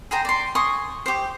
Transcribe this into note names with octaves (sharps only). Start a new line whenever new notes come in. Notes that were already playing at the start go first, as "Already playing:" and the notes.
G#4 C5 G5 A#5
D5 C6
G#5 C6 C#6 D#6
G4 C5